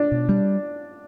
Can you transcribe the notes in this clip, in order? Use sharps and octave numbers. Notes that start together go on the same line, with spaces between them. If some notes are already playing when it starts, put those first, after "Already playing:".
Already playing: D4
B2
G3